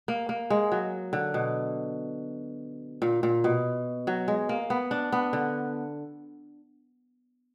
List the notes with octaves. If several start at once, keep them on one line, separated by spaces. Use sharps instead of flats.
A#3
A#3
G#3
F#3
D3
B2
A#2
A#2
B2
F#3
G#3
A#3
B3
D4
B3
D3